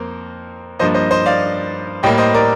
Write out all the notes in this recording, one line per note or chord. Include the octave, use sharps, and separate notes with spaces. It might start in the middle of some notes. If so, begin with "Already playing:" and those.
Already playing: F2 A#3 A#4 C5
G2 F3 A#3 C5 D#5
C5 D#5
C5 D#5
D5 F5
A2 G3 A#3 D#5 G5
C5 D#5
A#4 D5